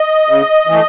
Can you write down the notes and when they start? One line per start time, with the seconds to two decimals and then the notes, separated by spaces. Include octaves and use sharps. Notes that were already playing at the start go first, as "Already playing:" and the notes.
Already playing: D#5
0.29 C#3
0.67 E3 A3